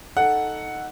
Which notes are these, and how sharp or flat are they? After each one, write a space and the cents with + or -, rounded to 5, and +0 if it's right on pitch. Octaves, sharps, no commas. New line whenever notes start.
D#4 +0 A4 +0 F#5 +0